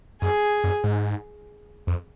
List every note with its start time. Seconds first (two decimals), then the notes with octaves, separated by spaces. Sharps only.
0.22 F#2 G#4
0.64 F#2
0.84 G#2
1.87 F2